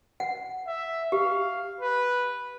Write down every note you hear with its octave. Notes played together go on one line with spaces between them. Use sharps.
F#5
E5
G4 F5
B4